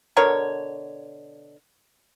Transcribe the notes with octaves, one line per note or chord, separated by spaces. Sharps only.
B2 D3 A#4 C#5